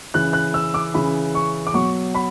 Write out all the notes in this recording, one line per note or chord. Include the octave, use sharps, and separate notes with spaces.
C#3 E3 F#6
F#6
E6
D6
C#3 E3 B5
C#6
D6
B2 F#3 C#6
B5